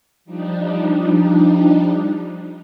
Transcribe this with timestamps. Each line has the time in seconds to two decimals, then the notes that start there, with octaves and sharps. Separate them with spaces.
0.25 F3 G3 D4 D#4